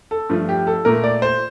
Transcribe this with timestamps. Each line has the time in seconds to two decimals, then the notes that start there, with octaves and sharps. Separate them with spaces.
0.11 A4
0.29 G2 F3 A3
0.49 G4
0.67 A4
0.85 A#2 A3 A#4
1.04 D5
1.22 C5